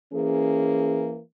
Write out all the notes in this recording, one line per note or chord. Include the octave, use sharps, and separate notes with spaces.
E3 A#3 C#4 G#4